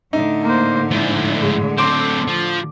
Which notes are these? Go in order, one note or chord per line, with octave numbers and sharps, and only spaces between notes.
A2 D3 D#4 E5
A#3 C5
G#2 F3 E4
G#3
F#3 C4 A4 C6 D6
F3